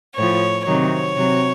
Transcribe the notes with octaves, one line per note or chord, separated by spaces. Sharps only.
A2 F3 C#5
C3 D#3 F#3 C#5
C3 F#3